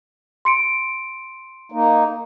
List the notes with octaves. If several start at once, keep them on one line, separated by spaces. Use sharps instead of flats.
C6 C#7 D7
A#3 D#4